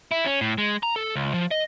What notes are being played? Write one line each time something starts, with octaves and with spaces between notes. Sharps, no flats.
E4
C#4
A2
G#3
A#5
A4
C#2
F3
D#5